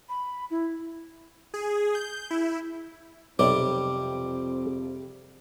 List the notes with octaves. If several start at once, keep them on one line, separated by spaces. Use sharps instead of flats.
B5
E4
G#4
G6
E4
B1 F2 C3 G3 C4 D5 D6